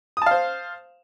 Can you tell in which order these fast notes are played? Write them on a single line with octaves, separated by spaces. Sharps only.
D#6 A5 F5 C5